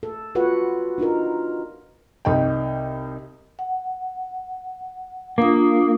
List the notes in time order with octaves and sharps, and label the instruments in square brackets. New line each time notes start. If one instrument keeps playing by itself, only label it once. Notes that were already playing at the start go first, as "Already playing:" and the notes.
[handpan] A4
F4 F#4 A4 B4 C#5 F#5
D4 D#4 F4 A#4
[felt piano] C2 D#4 G5
[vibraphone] F#5
[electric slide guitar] A#3 [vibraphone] D4 F4 D#6